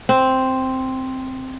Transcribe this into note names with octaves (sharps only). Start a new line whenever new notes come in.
C4